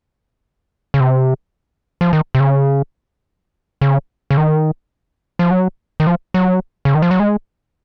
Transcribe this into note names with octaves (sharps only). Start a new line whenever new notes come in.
C#3
C3
F3
D#3
C3
C#3
C#3
C#3
D#3
F3
F#3
D#3
F3
F#3
C#3
D#3
F3
F#3
G#3